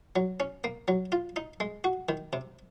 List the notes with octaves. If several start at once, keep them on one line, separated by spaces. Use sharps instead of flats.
F#3
C#4
A#3
F#3
F4
D#4
G#3
F#4
D#3
C3